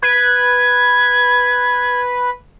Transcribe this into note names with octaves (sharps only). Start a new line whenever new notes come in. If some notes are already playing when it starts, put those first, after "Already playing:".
B4 G#6